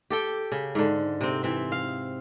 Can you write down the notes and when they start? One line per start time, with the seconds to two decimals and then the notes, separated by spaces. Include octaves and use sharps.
0.10 G4 A4 G5
0.52 C#3
0.75 G#2 D3
1.21 C3 C4
1.43 E3 C4 E5
1.72 F5